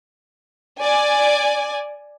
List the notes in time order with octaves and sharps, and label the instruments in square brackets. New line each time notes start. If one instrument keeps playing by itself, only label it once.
[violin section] D5 G#5